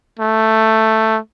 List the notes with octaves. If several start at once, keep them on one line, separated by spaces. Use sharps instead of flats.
A3